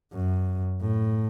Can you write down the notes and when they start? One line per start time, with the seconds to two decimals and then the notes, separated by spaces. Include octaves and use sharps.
0.13 F#2
0.81 A2